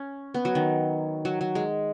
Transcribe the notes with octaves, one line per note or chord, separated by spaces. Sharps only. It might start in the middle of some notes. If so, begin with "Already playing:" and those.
Already playing: C#4
B3
F#3
D#3
F#3
F#3
G#3